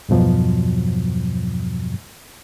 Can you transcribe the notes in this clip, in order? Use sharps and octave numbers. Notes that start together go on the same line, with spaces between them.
E2 G2 B2 F3 F#3